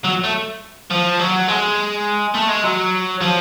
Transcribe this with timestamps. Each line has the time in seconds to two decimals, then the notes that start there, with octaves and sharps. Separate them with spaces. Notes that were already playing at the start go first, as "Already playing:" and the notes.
0.04 F#3
0.24 A3
0.91 F3
1.19 F#3
1.48 G#3
2.35 A3
2.49 G#3
2.64 F#3
3.21 F3